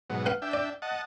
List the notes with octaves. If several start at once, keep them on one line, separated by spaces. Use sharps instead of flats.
G#2 B2 F#3
B4 F5 F#5
D4 E5 G5
D5
D#5 F#5 A5